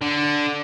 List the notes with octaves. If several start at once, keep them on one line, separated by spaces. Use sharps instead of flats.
D3